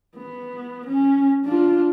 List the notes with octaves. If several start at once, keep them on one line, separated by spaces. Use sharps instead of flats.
B3
C#4
D4 F4